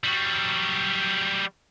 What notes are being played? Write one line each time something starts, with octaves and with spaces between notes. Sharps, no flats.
F#3 G3